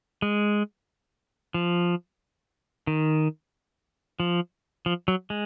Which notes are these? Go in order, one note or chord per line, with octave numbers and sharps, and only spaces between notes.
G#3
F3
D#3
F3
F3
F#3
G#3